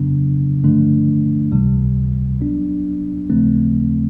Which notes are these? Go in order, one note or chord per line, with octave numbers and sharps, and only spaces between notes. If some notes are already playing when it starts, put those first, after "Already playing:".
Already playing: F2 C#3 F#3 B3 D4
G2 D3 F3 A3 D4
C#2 C3 E3 G3
F#3 B3 D4
D#2 C#3 F3 A3 C4